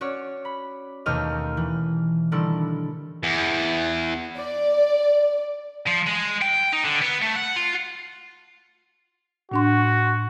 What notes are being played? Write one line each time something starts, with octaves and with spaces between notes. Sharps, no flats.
C#4 F#4 C#5 D5
B5
D#2 B2 A3 G4 D#5 F6
E3
D3 D#3 G3 E4 A4
E2
D5
F3
G#3
G5
D#4
D3
B3
A3
F#5
F4
A2 D4 F#4 C6